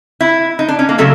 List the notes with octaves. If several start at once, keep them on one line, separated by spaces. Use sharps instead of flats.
E4
D#4
D4
C#4
A#3
C#3 F#3 A3